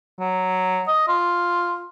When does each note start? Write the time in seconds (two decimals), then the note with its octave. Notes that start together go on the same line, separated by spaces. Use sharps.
0.20 F#3
0.88 D#5
1.08 F4